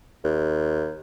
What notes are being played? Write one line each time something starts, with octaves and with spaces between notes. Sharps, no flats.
D#2